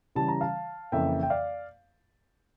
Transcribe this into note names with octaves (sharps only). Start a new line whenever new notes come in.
C#3 E3 G3 A5
A#5
F5 A5
F2 C#3 E3 A#3 E5 G5
G5
D5 F5